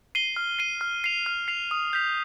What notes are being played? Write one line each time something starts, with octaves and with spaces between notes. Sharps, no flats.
C7 D#7 G7
F6
C7 D#7 G7
F6
C7 F7
F6
C7 F7
D#6
G6 B6 F7